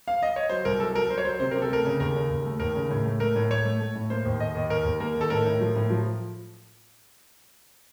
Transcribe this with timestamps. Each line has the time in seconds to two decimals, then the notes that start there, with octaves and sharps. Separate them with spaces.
0.08 F5
0.23 D#5
0.36 C#5
0.49 F#3 C5
0.65 C2 A#4
0.80 F#3 A4
0.94 F#3 A#4
1.10 F#3 C5
1.18 C#5
1.25 F#3 C5
1.40 C3 C5
1.51 C3 A#4
1.62 A4
1.70 A3 A#4
1.85 C#3
2.00 D#2 A#4
2.15 C#3
2.30 D#2
2.45 A3
2.60 D#2 A#4
2.75 C#3
2.90 A2
3.05 A3
3.20 A3 A#4
3.36 A2
3.51 A3 C#5
3.65 A3
3.80 A3
3.95 A2
4.10 A#3 C5
4.25 D#2
4.40 D#2 D#5
4.55 D#2
4.70 D#2 A#4
4.85 D#2
5.00 A#3 A#4
5.15 D#3
5.21 A4
5.30 A2 A#4
5.46 A2
5.61 F3
5.76 A2
5.90 F3